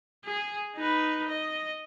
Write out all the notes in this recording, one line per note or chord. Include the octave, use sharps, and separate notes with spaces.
G#4
D#4 B4
D#5